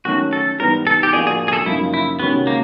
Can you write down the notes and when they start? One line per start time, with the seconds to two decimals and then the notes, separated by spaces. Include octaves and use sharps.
0.05 D#3 F#3 A3 C#4 F#4
0.33 A4
0.60 G#2 E3 G3 B3 A#4
0.87 A4
1.03 G4
1.13 A2 F3 A#3 D4 F#4 G#4
1.27 G#4
1.48 G#4
1.53 A4
1.66 F#2 C#3 F3 A#3 D#4 E4
1.94 E4
2.20 C3 D#3 G#3 B3 C#4 F#4
2.47 A#3